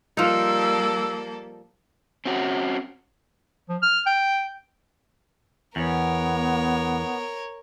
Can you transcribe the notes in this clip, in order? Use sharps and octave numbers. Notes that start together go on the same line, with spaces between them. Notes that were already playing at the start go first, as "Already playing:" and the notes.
F3 G3 A#3 D#4 A4 E6
C4 C#4 F#4
F3
F6
G5
E2 B3 A#4 C#5